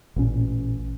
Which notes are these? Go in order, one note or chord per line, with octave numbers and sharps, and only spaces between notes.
A1 A#2 C#4